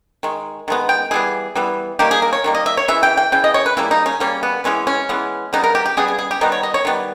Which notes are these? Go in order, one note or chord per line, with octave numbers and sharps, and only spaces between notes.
D#3 G#3
D#3 G#3 B3
G5
E3 G3 B3 G#4
E3 G3 B3
D#3 G3 A#3 G4
G#4
A#4
C#5
D#3 G3 A#3
D#5
E5
C#5
C#3 E3 E5
G5
G5
C#3 E3 G5
D#5
C#5
B4
C#3 G3 A#3 E4
D#4
C#4
C#3 G3 A#3 C#4
B3
E3 G#3 B3 C#4
C#4
E3 G#3 B3
C#3 G3 B3 D#4
A#4
G4
G4
C#3 G3 B3 G#4
G#4
G#4
G4
D#3 G3 B3 D#4
C#5
D#5
C#5
D#3 G3 B3